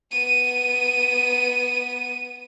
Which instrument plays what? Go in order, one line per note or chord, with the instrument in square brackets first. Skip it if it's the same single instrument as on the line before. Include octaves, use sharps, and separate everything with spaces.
[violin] B3 D#7